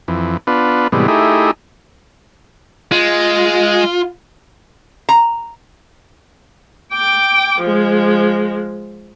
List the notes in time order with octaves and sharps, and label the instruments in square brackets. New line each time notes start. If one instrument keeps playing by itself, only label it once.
[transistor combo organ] F2 E3
B3 D4 F4 B4
A2 C3 E3 G3 G#3 B3
A3 D#4 E4 G4 G#4
[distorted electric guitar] G#3 [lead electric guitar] F4
[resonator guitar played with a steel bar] A#5
[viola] G5 D6
F3 G#3